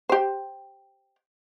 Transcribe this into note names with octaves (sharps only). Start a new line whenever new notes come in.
G4 C5